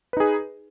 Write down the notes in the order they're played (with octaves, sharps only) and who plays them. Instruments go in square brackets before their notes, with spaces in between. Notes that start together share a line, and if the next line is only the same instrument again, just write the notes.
[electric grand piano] B4
D#4
G#4